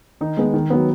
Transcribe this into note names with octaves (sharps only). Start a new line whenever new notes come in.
D#3 D#4
G#3 B3
D#3
F#3 B3